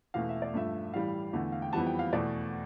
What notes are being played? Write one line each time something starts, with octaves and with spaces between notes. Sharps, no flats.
E2 B2 A3 F5
E5
D5
G2 F3 A3 E5
A2 E3 G3 F5
E2 D3 A3
F5
G5
F2 E3 G3 B3 A5
G5
F5
E2 B2 A3 D5